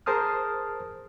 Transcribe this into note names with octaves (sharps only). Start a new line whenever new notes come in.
G#4 A#4 C5 A5 D#6 F6